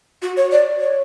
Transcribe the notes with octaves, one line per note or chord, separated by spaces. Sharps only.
F#4
C#5
D5
C#5